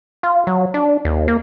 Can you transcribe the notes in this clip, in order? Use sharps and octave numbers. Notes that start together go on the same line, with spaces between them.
F4
F#3
D4
D#2
A#3